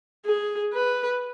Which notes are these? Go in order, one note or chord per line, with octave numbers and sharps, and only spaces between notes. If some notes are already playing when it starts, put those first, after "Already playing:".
G#4
B4